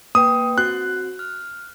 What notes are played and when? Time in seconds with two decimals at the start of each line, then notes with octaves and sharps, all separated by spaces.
0.15 A#3 B4 G5 D#6
0.58 C4 F#4 F#6
1.19 F6